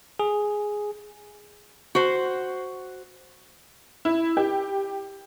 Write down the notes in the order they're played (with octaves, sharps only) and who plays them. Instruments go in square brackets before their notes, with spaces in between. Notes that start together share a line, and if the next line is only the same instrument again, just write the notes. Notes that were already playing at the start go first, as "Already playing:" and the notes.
[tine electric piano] G#4
[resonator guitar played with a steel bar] F#4 C5
[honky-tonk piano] E4
G4